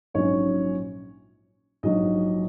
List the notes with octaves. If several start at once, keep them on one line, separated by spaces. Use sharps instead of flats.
A#1 G#2 F#3 C#4 C#5
A#1 G#2 F#3 D#5